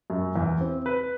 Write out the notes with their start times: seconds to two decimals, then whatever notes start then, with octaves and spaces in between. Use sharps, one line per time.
0.10 F#2
0.36 E2
0.61 C4
0.86 B4